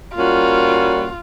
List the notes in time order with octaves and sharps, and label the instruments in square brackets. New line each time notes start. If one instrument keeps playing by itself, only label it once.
[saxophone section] A#2 G3 A#3 C#4 F#4 [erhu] F4